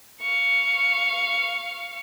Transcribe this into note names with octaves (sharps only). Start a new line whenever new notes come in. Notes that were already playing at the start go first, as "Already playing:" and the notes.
F5 C#6